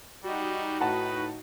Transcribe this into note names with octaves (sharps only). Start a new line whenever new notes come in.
G3 D#4 F#4
A2 B4 F#5 A5